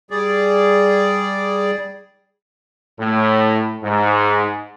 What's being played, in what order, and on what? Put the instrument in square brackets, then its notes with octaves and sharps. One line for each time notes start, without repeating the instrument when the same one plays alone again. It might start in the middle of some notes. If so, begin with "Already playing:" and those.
[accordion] G3 G#4 D5
[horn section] A2
G#2